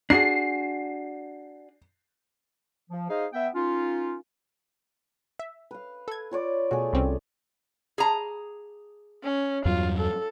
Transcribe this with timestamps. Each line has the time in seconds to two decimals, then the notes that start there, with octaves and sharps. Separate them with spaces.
0.10 D4 F#4 G#4 C7
2.90 F3
3.10 D#4 G#4 C5 D#5 F5
3.33 B3 E5 G5
3.55 A#3 C#4 D#4 F4
5.39 E5
5.71 B4 F5
6.08 A4 G#6
6.31 F4 C#5 D5
6.71 B2 A3 F#4 G#4
6.93 C2 C4 C#4
7.98 G#4 A#5
9.23 C#4
9.65 E2 G2 F#3 F4
9.98 A4